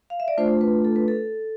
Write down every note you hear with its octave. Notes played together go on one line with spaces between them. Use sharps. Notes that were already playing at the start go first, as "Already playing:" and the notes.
F5
E5
D5
A3 D4 F4 C5
B4
A4
B4
A4